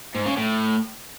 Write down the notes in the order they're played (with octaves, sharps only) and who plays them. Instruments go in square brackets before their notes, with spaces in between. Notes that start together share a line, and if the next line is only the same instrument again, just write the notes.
[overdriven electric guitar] G#2
C#3
A2